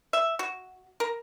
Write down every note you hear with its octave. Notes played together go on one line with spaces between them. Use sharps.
E5
F#4
A#4